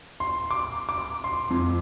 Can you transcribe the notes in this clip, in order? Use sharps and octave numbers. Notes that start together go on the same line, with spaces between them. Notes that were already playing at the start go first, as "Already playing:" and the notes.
C6
D6
D6
C6
F2